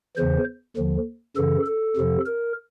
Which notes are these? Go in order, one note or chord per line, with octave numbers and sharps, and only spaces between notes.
E2 C#3 E3 C5
D#2 D3 F3
F#2 C#3 E3 A4
A4
F2 C3 F3
A#4